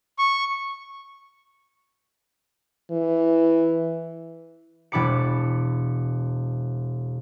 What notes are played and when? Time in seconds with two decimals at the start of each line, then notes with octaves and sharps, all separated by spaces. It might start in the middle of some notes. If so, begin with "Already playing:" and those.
0.18 C#6
2.91 E3
4.92 E1 D4 B5 D6 C#7